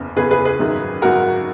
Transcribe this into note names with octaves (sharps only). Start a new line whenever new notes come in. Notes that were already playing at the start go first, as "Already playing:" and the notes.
Already playing: F#1 E2 C#3
F#1 E2 C#3 G#4 B4
G#4 B4
G#4 B4
G#1 F#2 D#3
G#1 F#2 D#3 F#4 A#4